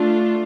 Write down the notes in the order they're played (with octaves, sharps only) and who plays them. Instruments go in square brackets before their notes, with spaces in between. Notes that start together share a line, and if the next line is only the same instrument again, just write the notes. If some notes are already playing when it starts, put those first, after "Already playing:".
Already playing: [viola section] A3 D4 F4